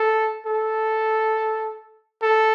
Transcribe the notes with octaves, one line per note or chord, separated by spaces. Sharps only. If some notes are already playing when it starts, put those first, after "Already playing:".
Already playing: A4
A4
A4